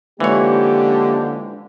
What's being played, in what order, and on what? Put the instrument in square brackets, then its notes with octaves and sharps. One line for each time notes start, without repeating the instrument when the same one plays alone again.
[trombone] D3 [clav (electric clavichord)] E3 C#5 [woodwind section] F3 G#3 A#3 [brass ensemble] C#4 G4